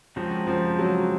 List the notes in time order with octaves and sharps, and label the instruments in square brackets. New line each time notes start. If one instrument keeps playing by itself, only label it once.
[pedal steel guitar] C#3 G#3 C4 F#4 A#4 [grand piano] F3
[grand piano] F3
F#3